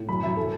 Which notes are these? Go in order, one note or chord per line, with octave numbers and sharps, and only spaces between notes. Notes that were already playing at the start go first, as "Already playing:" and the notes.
Already playing: A2
F#2 B5
F#2 E5
A4